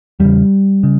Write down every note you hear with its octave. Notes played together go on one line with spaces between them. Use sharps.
E2 C#3 G3
C#3